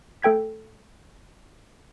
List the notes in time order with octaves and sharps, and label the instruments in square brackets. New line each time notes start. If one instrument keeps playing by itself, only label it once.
[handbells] A3 A4 G5 G#6 B6